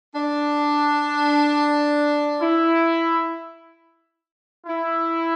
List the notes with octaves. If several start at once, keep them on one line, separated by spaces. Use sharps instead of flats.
D4
E4
E4